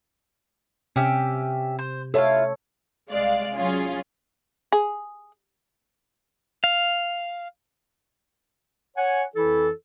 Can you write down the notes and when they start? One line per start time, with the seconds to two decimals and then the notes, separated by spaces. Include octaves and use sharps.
0.96 C3 C#4 G4 E5
1.79 C5
2.14 E4 F4 A4 C#5 F5
3.11 C2 G#3 D5 F5
3.56 F#3 C#4 F4 G#4
4.72 G#4
6.64 F5
8.97 C#5 F#5 G#5
9.35 F2 E3 E4 A4